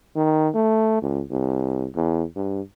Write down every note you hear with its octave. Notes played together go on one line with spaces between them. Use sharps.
D#3
A3
C#2
C2
E2
G2